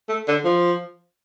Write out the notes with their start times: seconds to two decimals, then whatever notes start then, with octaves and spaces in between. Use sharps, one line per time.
0.09 A3
0.28 D3
0.45 F3